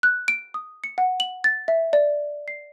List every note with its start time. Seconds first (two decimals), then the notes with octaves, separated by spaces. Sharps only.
0.03 F#6
0.28 D7
0.54 D#6
0.84 C#7
0.98 F#5
1.20 F#7
1.44 A6
1.68 E5
1.93 D5
2.48 C7